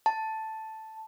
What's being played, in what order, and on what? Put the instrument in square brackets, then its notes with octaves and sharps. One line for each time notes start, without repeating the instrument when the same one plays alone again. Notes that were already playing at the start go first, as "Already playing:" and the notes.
[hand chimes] A5